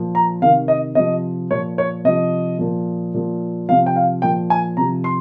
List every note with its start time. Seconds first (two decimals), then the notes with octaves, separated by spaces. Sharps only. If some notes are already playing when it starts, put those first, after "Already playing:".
Already playing: A#2 F3
0.15 A#5
0.41 C3 D#3 F5
0.68 D#5
0.95 C3 F3 D#5
1.51 A#2 F3 C#5
1.78 C#5
2.04 C3 F3 D#5
2.59 A#2 F3
3.14 A#2 F3
3.69 C3 F3 F5
3.86 G5
3.96 F5
4.22 A#2 F3 G5
4.50 G#5
4.77 C3 F3 A#5
5.04 C6